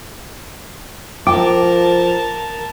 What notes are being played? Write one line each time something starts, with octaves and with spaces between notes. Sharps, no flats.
F3 A#4 G5 A5 D6